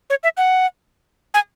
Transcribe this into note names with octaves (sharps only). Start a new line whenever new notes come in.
C#5
E5
F#5
G#5